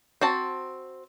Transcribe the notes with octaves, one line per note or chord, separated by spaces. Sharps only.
C4 F#4 A5